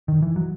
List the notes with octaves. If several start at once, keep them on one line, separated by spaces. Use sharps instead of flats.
D#3
E3
F#3